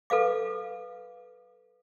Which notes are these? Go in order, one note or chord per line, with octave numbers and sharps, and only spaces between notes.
A4 B4 F5 D6